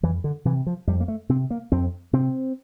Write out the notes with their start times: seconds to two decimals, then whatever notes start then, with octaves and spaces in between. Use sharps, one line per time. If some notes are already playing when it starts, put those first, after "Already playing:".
0.03 F2 E3
0.24 D3
0.45 C3 E3
0.67 F3
0.87 F2 G3
1.00 A#3
1.08 A3
1.29 C3 C4
1.50 A#3
1.72 F2 C4
2.13 C3 C4